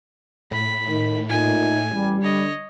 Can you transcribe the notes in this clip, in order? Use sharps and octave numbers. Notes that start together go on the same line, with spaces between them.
A2 B5 B6
D#3
A#2 A3 D#4 G#5
A1 G3
D3 C#5 D#5